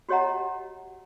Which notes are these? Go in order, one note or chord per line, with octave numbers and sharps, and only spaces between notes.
F#4 G4 C#5 D#5 F#5 A#5